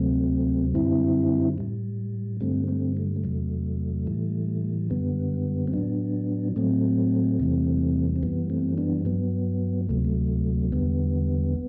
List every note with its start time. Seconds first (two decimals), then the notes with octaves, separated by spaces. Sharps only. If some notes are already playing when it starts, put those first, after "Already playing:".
Already playing: D2 C3 F#3 A3 C4
0.74 F#2 D3 G3 C4 E4
1.58 A2 G3
2.41 G2 D3 G3 A3 C4
2.68 A3 C4
2.97 A3
3.16 A3
3.24 E2 C3 F#3
4.07 A2 E3 G3
4.90 F#2 D3 G3 B3
5.68 C4
5.73 A2 F#3 B3 D4
6.56 A2 F#3 A3 C4
7.40 E2 C3 E3 G3
8.16 C4
8.23 F#2 E3 G3 B3
8.50 A3 C4
8.78 B3 D4
9.05 G2 F#3 B3
9.89 D2 C3 F#3 A3
10.05 A3
10.72 E2 D3 G3 B3